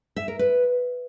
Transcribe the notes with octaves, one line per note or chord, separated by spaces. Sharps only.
E5
A#4
B4